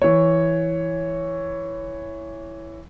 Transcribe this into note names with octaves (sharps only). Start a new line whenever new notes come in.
E3 C#5